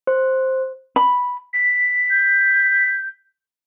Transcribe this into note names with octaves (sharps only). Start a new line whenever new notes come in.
C5
B5
B6
G6